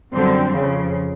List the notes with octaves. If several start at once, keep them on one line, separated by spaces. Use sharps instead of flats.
F#2 D3 G3 C4
F2 C#3 F3